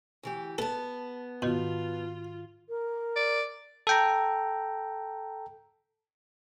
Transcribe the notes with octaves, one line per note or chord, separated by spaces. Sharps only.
D2 E3 G4
B3 A4 A5
G#2 B2 D#3 F4 F#4
A#4
D5
A4 G5 A#5